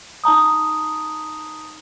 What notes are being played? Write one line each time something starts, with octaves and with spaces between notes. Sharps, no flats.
D#4 A5 A#5 D#6